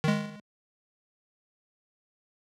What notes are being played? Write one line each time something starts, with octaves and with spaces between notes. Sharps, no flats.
D#3 G#3